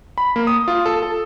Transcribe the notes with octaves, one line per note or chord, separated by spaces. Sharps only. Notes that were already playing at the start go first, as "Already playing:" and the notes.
B5
A#3
D#6
F4
A4
A4